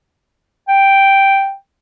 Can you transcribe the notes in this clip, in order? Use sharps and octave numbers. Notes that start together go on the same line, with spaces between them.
G5